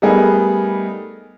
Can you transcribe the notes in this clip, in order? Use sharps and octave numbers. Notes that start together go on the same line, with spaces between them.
G3 A3 B3 D#4 G#4 A#4